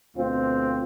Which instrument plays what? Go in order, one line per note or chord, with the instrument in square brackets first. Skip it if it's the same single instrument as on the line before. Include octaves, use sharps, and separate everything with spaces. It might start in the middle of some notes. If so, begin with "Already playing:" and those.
[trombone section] D2 B2 C4 F4